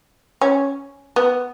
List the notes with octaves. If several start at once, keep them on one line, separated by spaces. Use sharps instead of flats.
C#4
B3